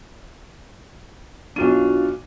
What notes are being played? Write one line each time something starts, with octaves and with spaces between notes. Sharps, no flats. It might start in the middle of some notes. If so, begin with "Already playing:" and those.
B1 D4 F4 F#4 D#7